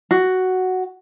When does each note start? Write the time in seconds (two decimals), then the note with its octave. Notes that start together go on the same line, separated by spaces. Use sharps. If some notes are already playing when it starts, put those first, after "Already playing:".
0.11 F#4